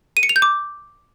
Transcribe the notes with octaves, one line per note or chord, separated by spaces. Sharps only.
D#7
C#7
F7
G6
D6